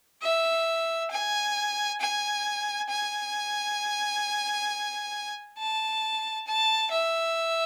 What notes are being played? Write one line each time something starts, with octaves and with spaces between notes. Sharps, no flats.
E5
G#5
G#5
G#5
A5
A5
E5